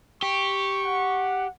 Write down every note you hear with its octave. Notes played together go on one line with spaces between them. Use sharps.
G4 C#6
F#5